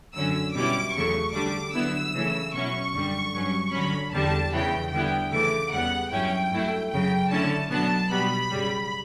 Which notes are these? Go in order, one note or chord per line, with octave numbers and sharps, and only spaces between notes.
F#2 D3 F#3 C#4 E6
B2 G3 C#4 E4 D6
E2 C#3 F#3 A3 C#6
D3 G3 D4 D6
D3 F#3 B3 E4 E6
C#3 E3 A3 C#4
B2 F#3 C#4 E4 C#6
F#2 D3 G3
G2 F#3 C#4
D3 F#3 C#4 B5
E2 D3 G3 A5
E2 C#3 E3 B3 G5
D3 G3 B3 E4 G5
C#3 E3 A3 D6
E2 C#3 G3 B3 F#5
G2 F#3 C#4 E4 G5
G2 F#3 A3 E4
F#2 C#3 F#3 G5
D3 A3 C#4 E4 A5
B2 F#3 B3 D4 A5
B2 G3 B3 B5
F#2 C#3 G3